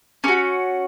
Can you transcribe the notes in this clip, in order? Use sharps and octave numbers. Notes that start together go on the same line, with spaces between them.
C#4 F#4